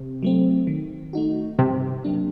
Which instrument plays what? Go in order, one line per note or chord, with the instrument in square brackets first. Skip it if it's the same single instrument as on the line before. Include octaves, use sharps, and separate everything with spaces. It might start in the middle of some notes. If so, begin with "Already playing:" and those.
Already playing: [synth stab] C3
[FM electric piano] F#3 A3 C4
D#3
A3 D#4 F#4
[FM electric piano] G2 [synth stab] C3
[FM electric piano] F#3 A#3 D4